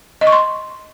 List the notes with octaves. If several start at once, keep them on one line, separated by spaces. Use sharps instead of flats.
D#5
C#6
C6